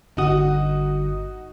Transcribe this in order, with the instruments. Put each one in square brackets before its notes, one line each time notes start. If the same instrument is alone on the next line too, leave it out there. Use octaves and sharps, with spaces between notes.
[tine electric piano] G1 D#6 [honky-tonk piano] D#4 F#4